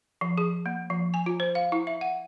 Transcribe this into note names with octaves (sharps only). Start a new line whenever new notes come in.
F3
G#4
A#3
F3
G#5
F4
C5
F5
E4
E5
F#5